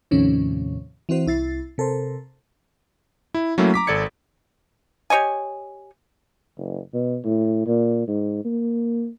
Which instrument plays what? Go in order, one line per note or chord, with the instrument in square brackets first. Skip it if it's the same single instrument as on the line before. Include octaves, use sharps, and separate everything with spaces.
[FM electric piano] D#2 A2 C3 D#3 F3 C#4
E3 C4 F#4 C5
C2 E4 A6 C7
C3 A4 A#4 C5
[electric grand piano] E4
F#3 A3 A#3 C#4 E4
A#5 D6 B6
G#1 A4 D5 G#6 C#7
[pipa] G4 C#5 D#5 G#5
[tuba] F#1
B2
A2
A#2
G#2
A#3